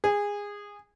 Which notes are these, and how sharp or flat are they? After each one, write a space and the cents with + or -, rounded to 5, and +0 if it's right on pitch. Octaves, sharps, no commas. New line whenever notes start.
G#4 -20